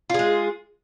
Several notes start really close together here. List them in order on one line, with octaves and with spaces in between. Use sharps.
F4 G#4 G#3